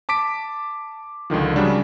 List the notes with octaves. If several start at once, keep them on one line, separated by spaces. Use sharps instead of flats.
A5 D6 B6 D7
C#2 D3 D#3 F3
C#3 F#3 G3 D4